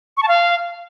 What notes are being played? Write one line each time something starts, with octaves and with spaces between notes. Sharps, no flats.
C#6
A5
F5